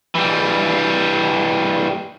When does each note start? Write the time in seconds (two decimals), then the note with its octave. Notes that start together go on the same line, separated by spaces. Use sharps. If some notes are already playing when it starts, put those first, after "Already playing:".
0.15 E3 G3